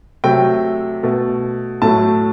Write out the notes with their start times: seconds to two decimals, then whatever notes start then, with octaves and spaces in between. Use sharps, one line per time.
0.24 C3 F#3 A3 G5
1.03 B2 A3
1.82 A2 F#3 A3 A5